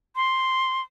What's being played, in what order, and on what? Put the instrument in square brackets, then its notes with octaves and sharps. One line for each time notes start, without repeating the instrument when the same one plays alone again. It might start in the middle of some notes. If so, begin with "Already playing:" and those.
[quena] C6